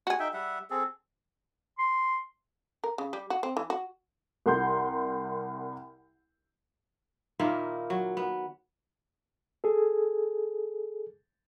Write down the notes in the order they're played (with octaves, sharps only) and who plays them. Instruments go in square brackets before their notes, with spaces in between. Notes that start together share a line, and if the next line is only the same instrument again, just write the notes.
[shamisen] F#4 G#4
[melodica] D#4 E5 G5
G3 E5 F#5
C4 G#4 A4
[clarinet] C6
[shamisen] A#4
C#3
G3
F#4
C4
E3
F#4
[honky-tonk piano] C2 A#4 F#5 C6 G6
[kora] A#2 D#3 A#3 E4
F#3
B3
[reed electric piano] G#4 A4